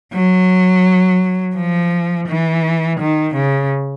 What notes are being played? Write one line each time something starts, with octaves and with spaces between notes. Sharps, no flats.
F#3
F3
E3
D#3
C#3